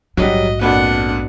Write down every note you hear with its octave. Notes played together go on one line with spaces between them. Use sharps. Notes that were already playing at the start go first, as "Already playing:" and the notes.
A#1 G#2 F#3 G3 F#4 D#5
F2 A#2 B3 D4 F#4 F#5